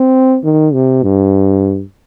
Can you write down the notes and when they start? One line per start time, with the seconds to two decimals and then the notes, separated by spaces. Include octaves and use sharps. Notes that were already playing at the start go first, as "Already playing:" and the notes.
Already playing: C4
0.44 D#3
0.74 C3
1.03 G2